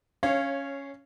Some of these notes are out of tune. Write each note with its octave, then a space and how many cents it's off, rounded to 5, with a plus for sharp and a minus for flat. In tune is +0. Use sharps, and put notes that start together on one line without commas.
C#4 +0 C#5 -15 F5 -15